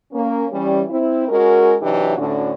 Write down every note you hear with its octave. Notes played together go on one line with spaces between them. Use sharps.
A#3 C#4
E3 G3 C#4
C4 E4
G#3 C#4 F#4 A#4
C3 E3 F#3 D4 D#4 G4
D2 A2 D3 C#4 D4 F#4